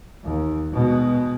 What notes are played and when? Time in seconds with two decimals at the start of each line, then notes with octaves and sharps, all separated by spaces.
0.24 D#2
0.73 B2 G#3